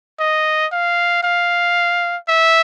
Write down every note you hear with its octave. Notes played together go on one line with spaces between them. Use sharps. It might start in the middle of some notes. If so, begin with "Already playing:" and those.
D#5
F5
F5
E5